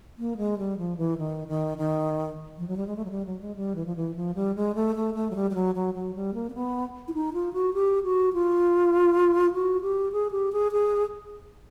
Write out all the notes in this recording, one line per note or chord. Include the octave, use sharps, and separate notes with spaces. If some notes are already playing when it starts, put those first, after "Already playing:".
A#3
G#3
G3
F3
E3
D#3
D#3
D#3
F3
F#3
G3
G#3
A3
F#3
G3
F#3
G#3
G3
E3
F3
E3
F3
G3
G#3
A3
A3
A3
F#3
G3
G3
F#3
F#3
F#3
G3
A#3
C4
B3
E4
D#4
F4
F#4
G4
F#4
F4
F#4
G4
G#4
G4
G#4
G#4